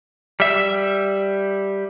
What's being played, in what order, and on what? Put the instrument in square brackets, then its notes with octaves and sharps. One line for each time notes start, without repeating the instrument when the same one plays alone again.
[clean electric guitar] G3 E5